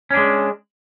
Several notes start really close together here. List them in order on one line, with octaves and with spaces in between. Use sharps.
C#4 D4 G#3